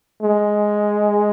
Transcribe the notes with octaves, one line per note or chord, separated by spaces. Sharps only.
G#3